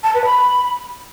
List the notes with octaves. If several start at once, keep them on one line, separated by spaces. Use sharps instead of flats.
A5
B4
B5